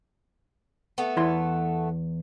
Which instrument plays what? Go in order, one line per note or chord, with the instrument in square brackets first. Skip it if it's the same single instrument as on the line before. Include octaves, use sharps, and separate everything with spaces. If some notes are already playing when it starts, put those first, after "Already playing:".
[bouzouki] A3 B3
[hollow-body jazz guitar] E2 E4 C6